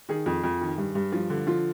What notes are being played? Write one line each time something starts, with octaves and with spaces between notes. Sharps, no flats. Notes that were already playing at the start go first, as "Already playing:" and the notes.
D#3 G#4
F2
F2
D#3
G2
G2
F3
D3
F3 F4